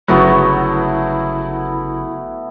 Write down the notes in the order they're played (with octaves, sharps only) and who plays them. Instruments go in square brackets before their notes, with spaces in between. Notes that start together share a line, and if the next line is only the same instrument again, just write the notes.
[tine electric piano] G1 C#3 B5 [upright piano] F#3 [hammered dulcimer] A3 B3 F#4 [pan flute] E4